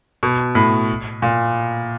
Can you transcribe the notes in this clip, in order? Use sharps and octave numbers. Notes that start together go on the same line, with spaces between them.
B2
A2
A#2